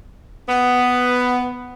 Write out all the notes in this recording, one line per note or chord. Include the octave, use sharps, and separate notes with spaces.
B3